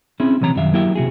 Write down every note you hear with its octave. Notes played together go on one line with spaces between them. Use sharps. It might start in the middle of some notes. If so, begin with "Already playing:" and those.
C4 C#4 E4 G#4
B1 C3 E3 C#5 A#5
F#2 D#3 G3 E5 F5
F#3 A#3 E4 G4 D5 E5
C3 F#4 G#4